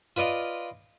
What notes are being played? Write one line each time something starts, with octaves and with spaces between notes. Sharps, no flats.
F4 B4 D5 D#5 F5